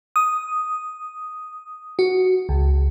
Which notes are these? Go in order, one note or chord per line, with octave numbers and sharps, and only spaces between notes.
D#6
F#4
C#2